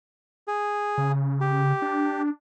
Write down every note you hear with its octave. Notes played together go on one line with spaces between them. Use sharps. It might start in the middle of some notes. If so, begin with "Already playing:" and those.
G#4
C#3
G4
D4